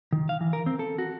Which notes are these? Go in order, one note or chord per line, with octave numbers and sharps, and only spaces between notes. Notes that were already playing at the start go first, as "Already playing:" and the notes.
D#3
F5
E3
A#4
C4
A4
F#4